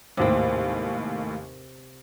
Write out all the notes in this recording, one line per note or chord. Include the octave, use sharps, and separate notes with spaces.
G#1 D#2 A2 C3 C4